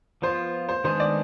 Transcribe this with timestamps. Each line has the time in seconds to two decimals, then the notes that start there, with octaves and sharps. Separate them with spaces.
0.22 F3 B3 F4 C5
0.69 C5
0.84 D#3 G#3 B3 D4 G#4 C5
1.00 D5